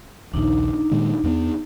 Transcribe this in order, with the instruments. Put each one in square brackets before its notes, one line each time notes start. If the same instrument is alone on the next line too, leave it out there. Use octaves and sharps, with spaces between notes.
[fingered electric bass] A#1 D#2 [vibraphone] D4 D#4
[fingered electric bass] A#2 D#3 G#3
E2 A#3 B3